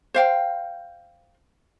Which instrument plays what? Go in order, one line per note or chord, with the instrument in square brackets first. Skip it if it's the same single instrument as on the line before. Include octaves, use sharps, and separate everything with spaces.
[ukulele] C5 F5 G5